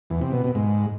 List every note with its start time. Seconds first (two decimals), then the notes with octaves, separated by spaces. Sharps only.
0.10 E2
0.21 C3
0.33 B2
0.44 B2
0.55 G#2